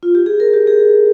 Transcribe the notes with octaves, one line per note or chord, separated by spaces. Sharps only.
F4
G4
G#4
A#4
G4
G#4